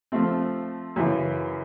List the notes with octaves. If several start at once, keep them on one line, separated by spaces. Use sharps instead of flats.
F3 A3 C4
F#2 C#3 E3